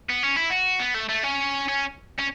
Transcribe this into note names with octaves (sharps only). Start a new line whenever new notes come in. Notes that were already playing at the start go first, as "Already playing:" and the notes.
B3
C#4
E4
F#4
B3
A3
A3
C#4
C#4
C#4